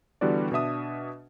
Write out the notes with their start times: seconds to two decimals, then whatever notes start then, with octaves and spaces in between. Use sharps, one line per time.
0.21 D3 E3 G3 B3 F#4 D5
0.52 B2 D4 E5 D#6